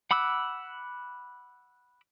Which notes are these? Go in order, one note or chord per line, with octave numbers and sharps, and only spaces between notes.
F#5 B5 D6 E6 F#6